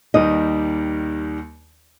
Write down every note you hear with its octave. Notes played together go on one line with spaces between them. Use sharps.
D#2 D#3 G3 D#5